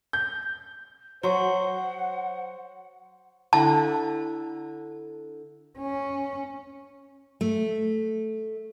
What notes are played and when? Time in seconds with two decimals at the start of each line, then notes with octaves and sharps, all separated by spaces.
0.13 G6
1.23 F#3 C5 C#5 F#5 C6 C#6
3.53 D3 E4 A5 A#5
5.78 C#4
7.41 A3